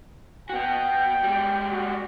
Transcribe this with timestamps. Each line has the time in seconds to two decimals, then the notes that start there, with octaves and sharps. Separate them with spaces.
0.49 B3 F#4 G5
1.23 G3 G#3
1.70 F#4